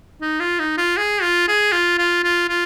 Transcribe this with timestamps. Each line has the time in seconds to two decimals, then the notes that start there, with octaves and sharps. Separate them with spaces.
0.21 D#4
0.40 F4
0.59 D#4
0.77 F4
0.97 G#4
1.22 F4
1.48 G#4
1.72 F4
1.98 F4
2.24 F4
2.49 F4